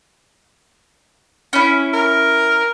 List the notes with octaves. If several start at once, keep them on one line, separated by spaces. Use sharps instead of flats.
C#4 E4
A#4